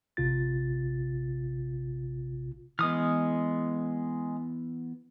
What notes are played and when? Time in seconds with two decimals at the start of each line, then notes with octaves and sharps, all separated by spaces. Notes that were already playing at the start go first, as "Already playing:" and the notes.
0.17 A1 C3 F4 A6
2.79 E3 G#3 B3 D#6 F6